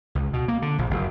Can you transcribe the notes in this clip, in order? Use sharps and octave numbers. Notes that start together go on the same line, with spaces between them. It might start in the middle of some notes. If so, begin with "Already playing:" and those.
C#2
B2
A#3
D3
A#1
F#1